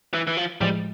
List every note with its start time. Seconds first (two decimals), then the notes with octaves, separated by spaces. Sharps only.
0.14 E3
0.27 E3
0.37 F3
0.61 A2 F3 G3 G#3